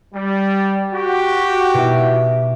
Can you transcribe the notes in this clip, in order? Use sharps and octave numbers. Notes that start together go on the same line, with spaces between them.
G3
F#4 G4
B2 E4